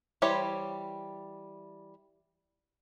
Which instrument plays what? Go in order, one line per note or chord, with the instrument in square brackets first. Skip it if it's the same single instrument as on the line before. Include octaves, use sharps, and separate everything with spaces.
[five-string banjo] E3 G3 G4 C5 C#5